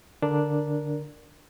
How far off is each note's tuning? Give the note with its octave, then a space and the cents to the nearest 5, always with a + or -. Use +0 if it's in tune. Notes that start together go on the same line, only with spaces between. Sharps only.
D3 +0 D4 +0 A#4 +0